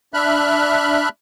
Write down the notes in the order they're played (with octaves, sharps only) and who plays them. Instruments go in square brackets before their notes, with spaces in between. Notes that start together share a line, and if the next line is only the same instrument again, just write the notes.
[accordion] D4 E5 B5 F6 F#6